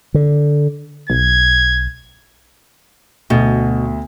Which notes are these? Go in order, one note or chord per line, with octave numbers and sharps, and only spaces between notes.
D3
B1 G#6
D2 B2